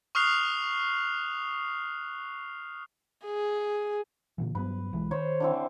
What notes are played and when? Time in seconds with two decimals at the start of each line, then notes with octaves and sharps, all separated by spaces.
0.15 C#6 D#6 F6 F#6 C7 F7
3.25 G#4
4.38 A#2 D3 E3
4.55 G2 F#3 B3 B4
4.93 B1 E3 G#3
5.11 D#3 C5 C#5
5.40 D3 E3 C4